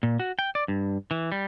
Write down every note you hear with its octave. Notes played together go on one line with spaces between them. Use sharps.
A#2
F#4
G5
D5
G2
E3
G3